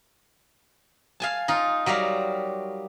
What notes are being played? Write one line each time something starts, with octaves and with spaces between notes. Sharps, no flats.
F5 G#5 A5
D#4 F4
F#3 G3 A#4 F5